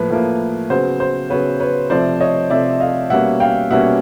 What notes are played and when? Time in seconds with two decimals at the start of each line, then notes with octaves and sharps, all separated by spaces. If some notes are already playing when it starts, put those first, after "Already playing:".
Already playing: A2 F3 A#3 B4
0.10 A2 F3 A#3
0.70 C#3 F#3 B3 C5
1.00 C5
1.30 C#3 F#3 B3 B4 C#5
1.60 B4 C#5
1.90 C3 F3 A3 C4 C5 D5
2.20 C#5 D#5
2.50 C3 F3 A3 C4 D5 E5
2.80 D#5 F5
3.10 B2 G3 A#3 C#4 E5 F#5
3.40 F5 G5
3.70 B2 G3 A#3 C#4 E5 F#5